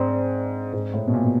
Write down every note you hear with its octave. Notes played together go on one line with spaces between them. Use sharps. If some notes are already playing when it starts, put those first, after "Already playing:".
Already playing: G#2 C4 D4
G#2
A2
B2
A#2
B2